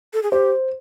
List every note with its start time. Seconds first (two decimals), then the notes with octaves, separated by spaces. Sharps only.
0.13 A4
0.23 G#4
0.31 G4 C5